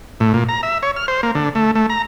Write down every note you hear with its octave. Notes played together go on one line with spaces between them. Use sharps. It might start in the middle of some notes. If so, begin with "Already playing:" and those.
A2
A#2
A#5
E5
C#5
F6
C5
A#3
D3
A3
A3
A#5